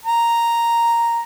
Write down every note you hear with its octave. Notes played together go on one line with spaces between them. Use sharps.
A#5